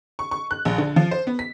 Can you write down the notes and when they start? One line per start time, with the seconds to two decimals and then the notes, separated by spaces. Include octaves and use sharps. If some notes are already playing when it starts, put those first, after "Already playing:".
0.19 C#6
0.31 C#6
0.51 F#6
0.65 A#1
0.78 D3
0.96 F3
1.11 C5
1.27 B3
1.39 B6